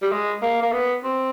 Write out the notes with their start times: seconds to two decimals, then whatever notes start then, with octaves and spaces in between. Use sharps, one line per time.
0.02 G3
0.12 G#3
0.42 A#3
0.62 A#3
0.72 B3
1.04 C4